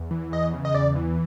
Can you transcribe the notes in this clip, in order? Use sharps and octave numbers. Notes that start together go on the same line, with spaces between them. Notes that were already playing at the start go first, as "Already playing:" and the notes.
Already playing: E2
E3
E2 D#5
C#3
D#5
E2 D5
E3